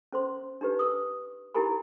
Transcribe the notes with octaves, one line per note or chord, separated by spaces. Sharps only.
C#4 C5 C6
D4 D#4 G4 B4
D#6 E6
D#4 E4 G4 A#4 G#5 B5